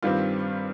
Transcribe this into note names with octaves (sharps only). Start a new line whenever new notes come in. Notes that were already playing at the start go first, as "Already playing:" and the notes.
G2 D#3 G3 C4 F4